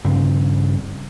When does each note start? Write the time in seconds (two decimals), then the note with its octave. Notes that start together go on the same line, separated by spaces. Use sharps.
0.05 G2 C#3 C4